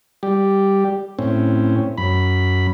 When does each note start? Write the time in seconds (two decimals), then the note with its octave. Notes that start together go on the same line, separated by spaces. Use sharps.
0.23 G3 G4
1.19 A2 C4 C#4
1.98 F#2 B5